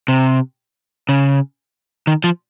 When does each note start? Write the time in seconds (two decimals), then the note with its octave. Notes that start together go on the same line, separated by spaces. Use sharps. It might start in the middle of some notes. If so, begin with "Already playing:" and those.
0.08 C3
1.09 C#3
2.07 D#3
2.24 F3